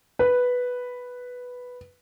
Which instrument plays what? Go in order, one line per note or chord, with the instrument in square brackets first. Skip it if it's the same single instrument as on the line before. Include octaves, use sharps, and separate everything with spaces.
[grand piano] B4